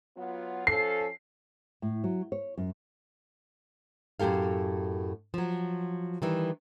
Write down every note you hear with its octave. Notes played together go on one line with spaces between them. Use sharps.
F#3 B3 F4
F3 C#4 A4 C7
A2
F#3
C#5
F#2
F#2 A2 G4 A4 F5
F3 F#3
D#3 E3 G3